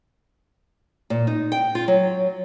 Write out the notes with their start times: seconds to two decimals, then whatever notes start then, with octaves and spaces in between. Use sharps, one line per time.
1.10 A#2
1.27 D#4
1.52 G5
1.75 F4
1.88 F#3